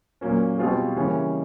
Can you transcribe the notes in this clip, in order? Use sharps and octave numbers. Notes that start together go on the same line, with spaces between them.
A#2 F#3 A#3 C#4
B2 G3 C4 F4 G#4
C#3 E3 G3 A#3 C#4